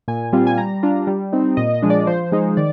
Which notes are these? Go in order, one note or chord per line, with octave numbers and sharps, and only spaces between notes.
A#2 G#5
G3 C4 F4
G#5
G3 A#5
D4 F4
G3
C4 D#4
A#2 D#5
D#5
F3 G#3 D4
D5
F3 C5
G#3 D#4
D#3 D5